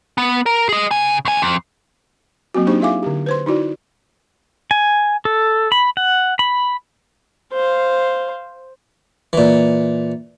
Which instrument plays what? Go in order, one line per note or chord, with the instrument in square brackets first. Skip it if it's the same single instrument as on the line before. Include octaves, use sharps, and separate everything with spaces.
[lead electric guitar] B3
A#4
G#4 D#5
C#3 G#5
D2 G#5
F2
[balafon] F#3 A#3 C4 F#4
A#3 D4 D#4 G4 C5 C#6
E4 G#4 E5 F5 G#5 D6
D3 G4
B4 C5 C6
D#4 E4 F#4 D5
[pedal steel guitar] G#5
A4
B5
F#5
B5
[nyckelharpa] C5 F5
[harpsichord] A#2 E3